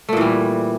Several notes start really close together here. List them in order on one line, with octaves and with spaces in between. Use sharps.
A3 A#2 E3 G3